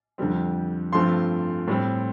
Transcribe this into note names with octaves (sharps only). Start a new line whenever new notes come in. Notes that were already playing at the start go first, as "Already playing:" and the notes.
F2 D3 G3 C4
G2 F3 A3 C4 C6
A2 G3 C4